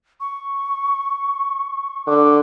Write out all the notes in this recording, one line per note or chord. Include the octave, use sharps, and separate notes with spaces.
C#6
D3 D6